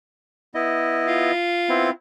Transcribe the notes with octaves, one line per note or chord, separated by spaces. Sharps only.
B3 E4 D#5
F4
B3 C4 E4